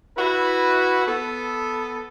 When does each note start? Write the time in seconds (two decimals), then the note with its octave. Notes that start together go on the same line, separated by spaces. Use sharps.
0.16 E4 F#4 B4
1.06 B3 A4